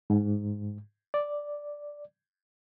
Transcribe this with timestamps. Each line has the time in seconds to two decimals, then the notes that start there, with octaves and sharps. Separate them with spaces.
0.10 G#2
1.14 D5